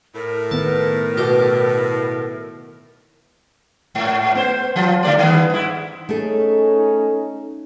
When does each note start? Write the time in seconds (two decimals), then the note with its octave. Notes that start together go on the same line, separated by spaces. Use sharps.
0.15 A2 A#4
0.51 D#3 B3 A5
1.17 B2 G4
3.95 G#2
4.35 B3 C5
4.76 F3 F4
5.03 D3 A3 D5
5.18 D#3 G3 B3
5.50 G#2 E4
6.09 A3 C#4 D#4 G#4 A4